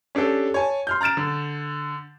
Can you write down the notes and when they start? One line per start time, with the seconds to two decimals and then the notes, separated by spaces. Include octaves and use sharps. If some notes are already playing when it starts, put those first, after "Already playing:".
0.15 C#4 D4 G4 A4
0.54 C#5 G#5 A5
0.87 C6 F6 G6
1.01 A#5 F6 A6 D7 E7
1.17 D3